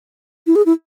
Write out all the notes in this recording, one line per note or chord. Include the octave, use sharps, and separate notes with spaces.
E4
G#4
E4